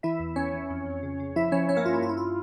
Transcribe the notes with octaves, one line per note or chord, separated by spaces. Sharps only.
E3 E4 E5
E2
E2 C#4 C#5
E3
F2
F2
C#3
C#3
F3 E4 E5
F3 C#4 C#5
G2 C#4 C#5
A#3 A#4
G2 F4
E4
G2 F4
E4
F4